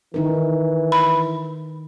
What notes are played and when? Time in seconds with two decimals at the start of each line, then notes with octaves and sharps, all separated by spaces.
0.14 D#3 E3 D#4 A#4
0.92 B5